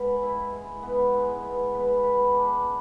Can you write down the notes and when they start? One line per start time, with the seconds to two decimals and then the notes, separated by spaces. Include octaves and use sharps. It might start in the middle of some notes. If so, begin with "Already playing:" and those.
Already playing: G#3 B3 B4
0.23 E4
0.53 G#3
0.83 B3
1.13 G#3
1.43 B3
1.74 B3
2.03 B4
2.35 D4